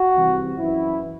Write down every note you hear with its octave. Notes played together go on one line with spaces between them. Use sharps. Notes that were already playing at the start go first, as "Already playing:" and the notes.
Already playing: F#4
C2 C3 E3
F#2 E3 E4